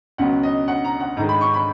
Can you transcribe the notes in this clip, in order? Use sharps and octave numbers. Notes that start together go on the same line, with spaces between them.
C#2 B2 F#3 F#5
D#5
F#5
A#5
F#5
G#2 D#3 G#3 A#5
B5
C#6
B5